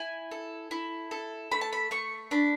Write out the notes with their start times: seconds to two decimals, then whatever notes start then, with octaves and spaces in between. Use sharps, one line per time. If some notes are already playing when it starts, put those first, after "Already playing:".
Already playing: E4 G#5
0.31 A4
0.71 E4
1.11 A4
1.52 A3 B5
1.61 A5
1.73 B5
1.91 A3 C#6
2.31 D4 B5